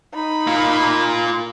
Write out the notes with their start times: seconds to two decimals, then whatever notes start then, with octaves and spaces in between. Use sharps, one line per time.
0.14 D#4 B5
0.47 A#3 F4